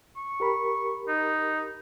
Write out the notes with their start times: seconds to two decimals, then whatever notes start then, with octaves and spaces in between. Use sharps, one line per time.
0.17 C#6
0.40 G4 A#4 B5
1.08 D#4